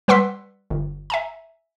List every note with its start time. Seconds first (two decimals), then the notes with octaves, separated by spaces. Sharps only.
0.08 G3 B4 F#5 C6 E6 B6
0.70 G1
1.10 E5 G#5 A#5